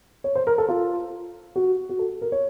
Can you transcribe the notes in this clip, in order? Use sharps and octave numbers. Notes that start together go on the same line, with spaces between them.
C#5
C5
A#4
A4
F4
F#4
F#4
A4
A#4
C#5